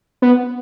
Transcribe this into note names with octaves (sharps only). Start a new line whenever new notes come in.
B3